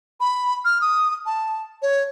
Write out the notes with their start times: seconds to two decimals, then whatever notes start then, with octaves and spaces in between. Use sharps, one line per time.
0.20 B5
0.65 F6
0.81 D#6
1.26 A5
1.82 C#5